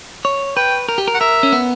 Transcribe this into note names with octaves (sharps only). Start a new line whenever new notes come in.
C#5
B4 G5
A#4
G4
A#4
F#5
A#4 E5
C#4
B3